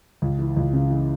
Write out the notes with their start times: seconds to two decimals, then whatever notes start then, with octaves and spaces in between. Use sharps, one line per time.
0.22 C#2
0.39 E3
0.57 C#2
0.73 C#3
0.91 E3